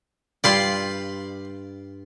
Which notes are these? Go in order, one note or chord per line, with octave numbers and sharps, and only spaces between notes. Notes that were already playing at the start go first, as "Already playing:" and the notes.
G2 F4 D5 G5 B5 C6